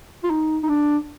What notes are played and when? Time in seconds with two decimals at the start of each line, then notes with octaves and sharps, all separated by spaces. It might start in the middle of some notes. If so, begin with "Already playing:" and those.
0.24 F4
0.30 D#4
0.63 D#4
0.69 D4